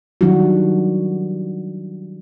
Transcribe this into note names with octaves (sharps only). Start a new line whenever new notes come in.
D#3 F#3 G3 D4 E4 F#4